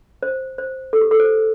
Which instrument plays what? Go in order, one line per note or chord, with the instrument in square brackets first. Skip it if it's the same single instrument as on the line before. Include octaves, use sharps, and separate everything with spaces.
[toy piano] C5
C5
A4
G4
A4
C5